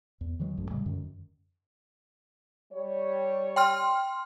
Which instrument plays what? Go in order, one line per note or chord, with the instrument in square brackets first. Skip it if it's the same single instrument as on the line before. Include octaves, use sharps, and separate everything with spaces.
[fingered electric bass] E2
D#3 E3 F#3 G#3
A1 F#2 A2
A2 C#3 G3 G#3
F#2 D3 D#3
[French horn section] G3 C#5
[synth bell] G5 C6 F6